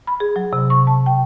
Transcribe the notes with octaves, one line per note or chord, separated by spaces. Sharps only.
B5
G#4
F#3
C3
C#6
A5
G5